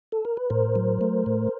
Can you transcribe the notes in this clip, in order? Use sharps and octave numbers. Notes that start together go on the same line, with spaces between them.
A4
A#4
B4
A2 A#4 C5
F#3
A3
A2